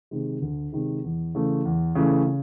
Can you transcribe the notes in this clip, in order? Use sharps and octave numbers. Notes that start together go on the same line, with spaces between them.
C3 D#3 G#3
D2
C3 D#3 G#3
E2
C#3 E3 A3
E2
C#3 E3 A3
C#3